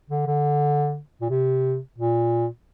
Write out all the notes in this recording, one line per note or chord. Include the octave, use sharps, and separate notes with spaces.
D3
D3
A#2
C3
A#2